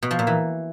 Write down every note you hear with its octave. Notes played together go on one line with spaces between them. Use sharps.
B2
F3
A#2
E3